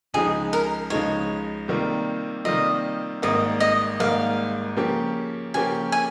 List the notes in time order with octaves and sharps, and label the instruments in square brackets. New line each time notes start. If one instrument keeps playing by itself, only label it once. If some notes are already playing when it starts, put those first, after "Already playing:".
[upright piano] C#2 C#3 F3 G#3 D#4 [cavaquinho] G#4
[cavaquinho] A#4
[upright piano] C#2 C#3 F3 G#3 D#4 [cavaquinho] C#5
[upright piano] C3 D#3 G3 A#3 F4
[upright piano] C3 D#3 G3 A#3 F4 [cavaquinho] D#5
[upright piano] G#1 G#2 G3 A#3 [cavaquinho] D#5
[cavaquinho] D#5
[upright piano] G#1 G#2 G3 A#3 [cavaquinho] F5
[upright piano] C#3 F3 A#3 C#4 G4
[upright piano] C#3 F3 A#3 C#4 G4 [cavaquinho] G#5
[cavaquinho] G#5